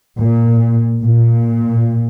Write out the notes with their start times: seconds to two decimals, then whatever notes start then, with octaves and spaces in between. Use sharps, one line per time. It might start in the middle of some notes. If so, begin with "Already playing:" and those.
0.19 A#2
1.02 A#2